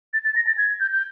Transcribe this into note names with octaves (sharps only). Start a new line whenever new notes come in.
A6
A6
A#6
A6
G#6
G6
G6